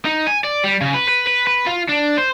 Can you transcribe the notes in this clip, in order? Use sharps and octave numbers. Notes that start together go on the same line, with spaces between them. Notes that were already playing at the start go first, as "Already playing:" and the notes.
D#4
G#5
D5
G3
C#3
B4
B4
B4
B4
F4
D4
C5